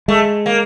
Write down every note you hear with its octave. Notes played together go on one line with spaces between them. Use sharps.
G#3 A3
A#3